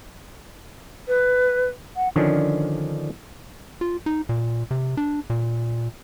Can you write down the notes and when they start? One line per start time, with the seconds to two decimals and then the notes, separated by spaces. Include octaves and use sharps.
1.07 B4
1.96 F#5
2.16 D3 D#3 F3 C#4 D4
3.81 F4
4.06 D#4
4.29 A#2
4.71 C3
4.97 D4
5.30 A#2